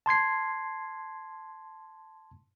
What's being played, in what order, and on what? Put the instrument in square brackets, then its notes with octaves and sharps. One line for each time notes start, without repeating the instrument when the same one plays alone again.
[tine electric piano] A5 C6 G#6 C7